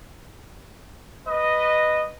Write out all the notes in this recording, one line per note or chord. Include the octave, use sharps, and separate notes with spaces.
B4 D#5